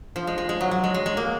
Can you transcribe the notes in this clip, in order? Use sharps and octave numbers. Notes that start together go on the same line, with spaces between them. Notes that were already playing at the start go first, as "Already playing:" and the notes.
F3
G#3
G#3
G#3
F#3
F#3
G#3
G#3
G#3
A#3